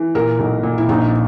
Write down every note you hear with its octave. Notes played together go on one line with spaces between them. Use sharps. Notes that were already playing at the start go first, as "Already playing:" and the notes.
Already playing: E3
A#2 A#4
B1
A#2
E4
A#1 D#4